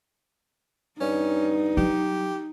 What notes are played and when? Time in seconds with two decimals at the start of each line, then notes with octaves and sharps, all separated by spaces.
1.01 G2 C#4 D#4
1.77 F#3 G3 G4